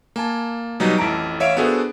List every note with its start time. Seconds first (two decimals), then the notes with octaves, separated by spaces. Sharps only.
0.16 A#3 G#5 A5
0.80 B2 F#3 G3 D#4 B4
0.98 A1 F2 E4 A5 A#5 D7
1.40 A1 C#5 E5 F5 D7
1.57 B3 D4 F#4 G#4 A4 C5